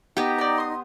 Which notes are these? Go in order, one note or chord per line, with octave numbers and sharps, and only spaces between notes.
B3 D#4 G4 G5
D5 G5 A#5
C6 D#6